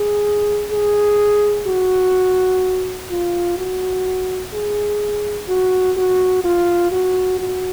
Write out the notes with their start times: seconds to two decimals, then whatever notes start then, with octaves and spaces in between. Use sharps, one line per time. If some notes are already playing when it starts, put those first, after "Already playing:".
Already playing: G#4
0.71 G#4
1.67 F#4
3.10 F4
3.58 F#4
4.53 G#4
5.49 F#4
5.97 F#4
6.44 F4
6.92 F#4
7.40 F#4